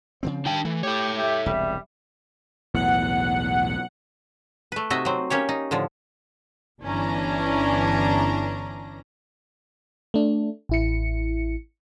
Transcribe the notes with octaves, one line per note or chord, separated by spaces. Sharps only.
C#3 F3 C4
D#3 D4 G5 A5
E3 A3
G4 A4 C#5
G4 E5
E1 C2 G3
B1 E2 A2 F#5
A3 B4
C3 D#4 F#4 D#5 E5
F#3 C4
A#3 C#4 G4 C#5
D#4
A2 D3 F3
G1 E3 C#4 D4 A#5
A3 D4
A1 E4 C#7